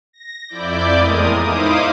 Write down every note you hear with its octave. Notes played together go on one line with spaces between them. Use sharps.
A#6
F2 E4 D5 D6 G6
E2 A2 G#3 A#4 D#6
D#4 E4 C5 F5 D6 D#6